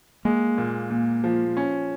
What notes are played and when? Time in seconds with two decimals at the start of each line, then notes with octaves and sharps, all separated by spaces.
0.25 G#3 A#3
0.58 A#2
0.90 A#2
1.24 F3
1.57 C#4